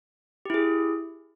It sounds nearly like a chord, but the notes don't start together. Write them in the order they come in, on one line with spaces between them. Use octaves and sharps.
G4 E4 G#4